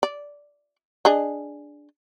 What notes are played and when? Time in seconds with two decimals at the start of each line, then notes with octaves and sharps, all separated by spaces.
0.03 D5
1.05 D4 G#4 D#5